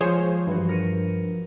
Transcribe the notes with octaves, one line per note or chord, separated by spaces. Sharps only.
F3 G#3 F4 G#4 C5 C#5 F5
G2 E3 F#4
A#4 C#7 D#7